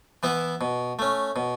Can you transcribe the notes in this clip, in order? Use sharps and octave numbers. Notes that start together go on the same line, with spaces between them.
E3 B3 E4
B2
A3 C#4
B2